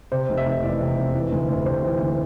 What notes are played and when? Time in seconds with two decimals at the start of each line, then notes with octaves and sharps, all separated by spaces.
0.12 C3 C5
0.29 F1
0.38 E5
0.45 F1
0.63 E2 D5
0.80 C3
0.97 F1
1.15 E3
1.32 D2
1.49 D2
1.66 C3 C5
1.83 E3
2.01 D2